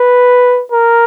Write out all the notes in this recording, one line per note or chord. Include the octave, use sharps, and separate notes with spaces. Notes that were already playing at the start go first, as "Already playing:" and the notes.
Already playing: B4
A#4